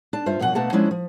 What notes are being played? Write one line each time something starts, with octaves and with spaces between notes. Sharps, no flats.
D4 A5
G2 F4 C5 E5
F#2 B2 F3 D4 F#5 G#5
B2 A3 A#3 B4 F#5 A5
F3 G#3 C#4 D4 E4
F3